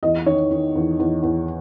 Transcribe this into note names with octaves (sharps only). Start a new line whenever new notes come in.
E2 D#5
D#3 C#5
D#3
E2
E2
E2